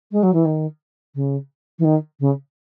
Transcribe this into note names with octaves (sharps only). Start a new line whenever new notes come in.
G#3
F#3
E3
D#3
C#3
E3
D#3
C#3